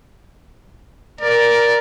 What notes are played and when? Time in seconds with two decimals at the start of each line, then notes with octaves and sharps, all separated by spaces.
1.21 A#4 D5